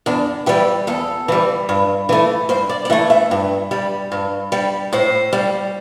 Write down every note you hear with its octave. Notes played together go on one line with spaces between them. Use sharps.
E2 D4
E3 G3 G4
E2 A4
E3 G3
G2
E3 A3
G2 C5
D5
D5
E3 A3 E5
E5
G2
G3
G2
G3
A2 C5
G3